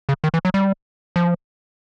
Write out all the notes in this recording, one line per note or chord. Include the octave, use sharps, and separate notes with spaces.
C#3
D#3
E3
F#3
G3
F3